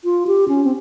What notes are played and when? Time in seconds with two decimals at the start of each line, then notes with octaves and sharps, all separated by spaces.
0.04 F4
0.27 G4
0.48 C#4
0.64 C4